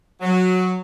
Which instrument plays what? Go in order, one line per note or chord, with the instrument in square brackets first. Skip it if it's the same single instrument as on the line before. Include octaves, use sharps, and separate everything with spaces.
[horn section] F#3